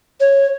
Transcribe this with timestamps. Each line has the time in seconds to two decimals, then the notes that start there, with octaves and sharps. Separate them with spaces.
0.21 C#5